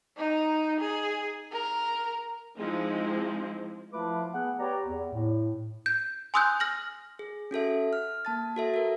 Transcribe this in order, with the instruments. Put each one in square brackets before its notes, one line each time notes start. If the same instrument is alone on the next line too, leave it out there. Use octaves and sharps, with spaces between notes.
[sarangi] D#4
G#4
A#4
[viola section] F3 G#3 C4 D#4 E4
[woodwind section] F3 A3 E4 F4 B4 D6
B3 G#4 F#5
G4 B4 C#5 D5 A#5
E2
A2
[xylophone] G6
G#5 C6 D#6 E6 F#6 G6
F6 A#6 F#7
[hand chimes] G#4
C#4 F#4 A4 E5
F6
A#3 A5 A6
F#4 A4 E5
F#4 A#4